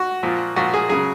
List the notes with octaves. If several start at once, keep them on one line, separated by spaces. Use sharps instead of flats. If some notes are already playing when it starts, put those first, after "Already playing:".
Already playing: F#4
A#2 F3
A#2 F3 F#4
G#4
C#3 F#3 G#4